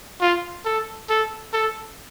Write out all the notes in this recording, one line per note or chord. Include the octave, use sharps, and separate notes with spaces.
F4
A4
A4
A4